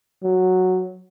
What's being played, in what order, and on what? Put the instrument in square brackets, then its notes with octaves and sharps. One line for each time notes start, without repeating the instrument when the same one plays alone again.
[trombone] F#3